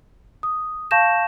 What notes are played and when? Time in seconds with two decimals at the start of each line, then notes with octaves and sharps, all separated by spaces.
0.43 D#6
0.91 F5 A5 C#6 G6 A#6 E7